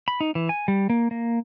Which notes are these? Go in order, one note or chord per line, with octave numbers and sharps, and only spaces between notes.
B5
D#4
E3
G#5
G3
A#3
A#3